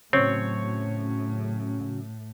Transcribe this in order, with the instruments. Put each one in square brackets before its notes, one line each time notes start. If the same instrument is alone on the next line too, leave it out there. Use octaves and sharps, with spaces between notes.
[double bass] A2 [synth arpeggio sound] C#3 F#3 C#4 [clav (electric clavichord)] C4 [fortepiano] C#5